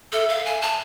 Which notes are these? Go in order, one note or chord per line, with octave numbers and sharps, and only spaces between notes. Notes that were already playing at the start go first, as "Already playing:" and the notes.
A4 E5
F5
G#5
A5